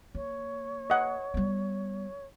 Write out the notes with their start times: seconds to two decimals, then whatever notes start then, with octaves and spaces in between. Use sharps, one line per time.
0.15 A#3 C#5
0.90 D#5 F#5
1.34 G3 B3